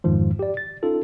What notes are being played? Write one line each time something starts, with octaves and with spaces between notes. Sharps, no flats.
F2 G#2 D#3 F3
G4 D5
A6
C#4 D#4 F4 A4